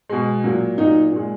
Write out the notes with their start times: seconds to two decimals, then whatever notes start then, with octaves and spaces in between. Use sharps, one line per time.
0.09 B2 G#3
0.44 A#2 F#3
0.78 A#2 F#3 D#4
1.12 A#2 G#3